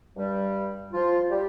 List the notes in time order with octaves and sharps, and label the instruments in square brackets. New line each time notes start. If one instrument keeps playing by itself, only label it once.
[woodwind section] G2 G3
F3 F4
G3 G4